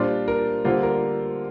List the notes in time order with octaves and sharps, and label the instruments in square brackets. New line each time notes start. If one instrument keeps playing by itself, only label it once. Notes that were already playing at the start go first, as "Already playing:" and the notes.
Already playing: [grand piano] A#2 G3 D4 F4 C5
A#4
D3 G3 A#3 F4 C5
A#4